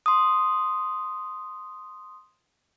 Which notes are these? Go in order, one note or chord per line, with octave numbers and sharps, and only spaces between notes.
C6 D#6